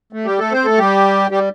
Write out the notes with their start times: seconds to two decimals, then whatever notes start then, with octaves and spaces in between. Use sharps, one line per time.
0.13 A3
0.25 G3 G4
0.39 A3 A4
0.52 C4 C5
0.65 A3 A4
0.78 G3 G4
1.31 G3 G4